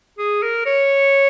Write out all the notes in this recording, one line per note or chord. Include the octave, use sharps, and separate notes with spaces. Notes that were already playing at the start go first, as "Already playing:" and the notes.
G#4
A#4
C#5